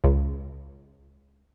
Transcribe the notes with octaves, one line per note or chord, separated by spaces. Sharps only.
C#2